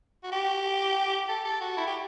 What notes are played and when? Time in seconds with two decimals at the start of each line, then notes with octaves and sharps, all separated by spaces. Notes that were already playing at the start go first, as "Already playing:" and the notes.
0.24 F#4
0.32 G4
1.29 A4
1.45 A4
1.61 F#4
1.77 E4
1.87 G4